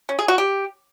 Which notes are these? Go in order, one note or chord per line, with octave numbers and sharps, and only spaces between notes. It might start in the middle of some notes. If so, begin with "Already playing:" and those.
C#4
G#4
F#4
G4